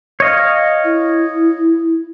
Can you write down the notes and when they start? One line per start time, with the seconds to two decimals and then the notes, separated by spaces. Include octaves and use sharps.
0.20 C#5 D#5 F5
0.84 E4